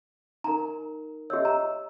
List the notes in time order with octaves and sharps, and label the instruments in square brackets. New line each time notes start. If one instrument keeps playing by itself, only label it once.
[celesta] D#4 A#4 [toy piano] A#5
[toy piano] G4 C#5 [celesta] D#5 E5 E6
[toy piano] A#5